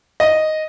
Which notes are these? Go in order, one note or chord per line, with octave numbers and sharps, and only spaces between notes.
D#5